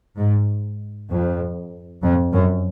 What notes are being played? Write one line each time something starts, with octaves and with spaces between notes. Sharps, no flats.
G#2
F2
F2
F#2